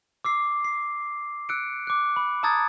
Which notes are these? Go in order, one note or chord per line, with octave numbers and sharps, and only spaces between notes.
D6 E6 C7
C7
E6 F#6 C#7 D7
D6 F#6
B5
A5 A#5 D#6 E6 G#6 A6